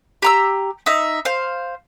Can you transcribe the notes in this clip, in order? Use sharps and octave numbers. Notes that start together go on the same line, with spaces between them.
G4 A#5 E6
D#4 E5
C5 F5